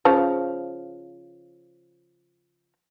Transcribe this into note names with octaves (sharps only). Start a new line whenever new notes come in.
C#3 F3